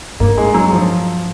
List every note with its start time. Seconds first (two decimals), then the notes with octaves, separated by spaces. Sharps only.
0.20 G2 A#3
0.37 G#3
0.54 F#3
0.72 F3